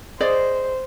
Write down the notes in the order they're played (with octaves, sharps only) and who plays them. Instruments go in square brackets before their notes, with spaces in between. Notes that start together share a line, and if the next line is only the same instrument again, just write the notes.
[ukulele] G#4 D5 D#5 [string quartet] C5